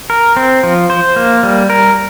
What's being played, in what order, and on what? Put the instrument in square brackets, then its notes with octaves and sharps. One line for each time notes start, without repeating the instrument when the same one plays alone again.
[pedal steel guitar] A#4
C4
F3
C5
A#3
G3
A#4